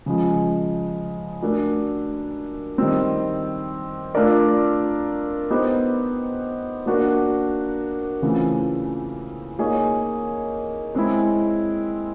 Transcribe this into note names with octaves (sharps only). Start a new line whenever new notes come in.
C#3 F3 G#3
A3 D4 F#4 A#4
D#3 G3 C4
A3 D4 F4 A#4 D5
B3 D#4 G4 C5
A#3 D4 F#4 A#4
C#3 E3 A3 C4 F4
A#3 D#4 G#4 C#5
G#3 C4 E4